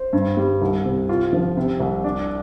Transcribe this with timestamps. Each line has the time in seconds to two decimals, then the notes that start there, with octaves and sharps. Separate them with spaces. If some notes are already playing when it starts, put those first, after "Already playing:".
Already playing: C5
0.13 G2
0.37 G3
0.61 C2
0.85 C3
1.09 F4
1.33 F3
1.57 C3
1.80 C2
2.04 D4